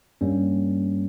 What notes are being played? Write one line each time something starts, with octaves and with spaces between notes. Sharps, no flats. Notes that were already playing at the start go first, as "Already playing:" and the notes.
G2 G3 A#3 C#4